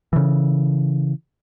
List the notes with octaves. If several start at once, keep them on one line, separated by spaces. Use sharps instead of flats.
C#3 E3